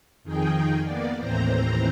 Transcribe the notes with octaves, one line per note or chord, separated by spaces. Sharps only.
F2 D#3 D#4 G#4 G5
A#3 B3 D5
D#2 A2 E3 C4 C5 A#5